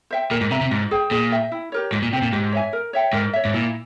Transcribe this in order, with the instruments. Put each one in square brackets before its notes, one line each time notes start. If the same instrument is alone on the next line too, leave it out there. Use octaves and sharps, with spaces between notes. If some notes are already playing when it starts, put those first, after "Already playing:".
[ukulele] C5 E5 G5
[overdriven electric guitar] A#2 [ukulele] A#4
[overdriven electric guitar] G#2
[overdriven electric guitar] C3 [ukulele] E5 A#5
[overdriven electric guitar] C3
[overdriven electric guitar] G#2 [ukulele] F4
[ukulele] G#4 C5 G5
[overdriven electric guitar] A#2 [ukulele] G#4
[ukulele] E5 G5
E4
G4 A#4 C#5
[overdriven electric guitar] G#2 [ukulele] F4
[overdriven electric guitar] A#2
[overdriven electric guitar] C3 [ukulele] C5 G5
[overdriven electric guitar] A#2
[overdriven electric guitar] G#2 [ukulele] G4
[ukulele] C#5 E5 G#5
A#4
C#5 E5 G5
[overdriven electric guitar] G#2 [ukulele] A#4
[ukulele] C#5 E5
[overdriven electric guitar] G#2
[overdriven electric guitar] A#2 [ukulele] E4